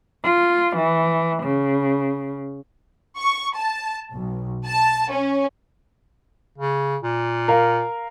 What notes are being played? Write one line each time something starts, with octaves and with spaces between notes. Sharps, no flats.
F4
E3
C#3
C#6
A5
B1
A5
C#4
C#3
A#2
A#4 F5